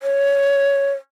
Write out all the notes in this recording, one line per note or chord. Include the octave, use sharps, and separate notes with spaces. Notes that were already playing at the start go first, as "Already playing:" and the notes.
C#5